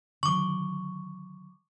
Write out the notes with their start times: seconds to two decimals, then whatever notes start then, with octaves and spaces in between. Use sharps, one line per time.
0.23 D3 D#3 F#3 C#6 D6